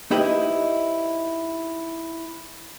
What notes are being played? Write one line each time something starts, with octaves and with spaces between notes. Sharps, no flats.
D#4 E4 G4 B4 C5 D#5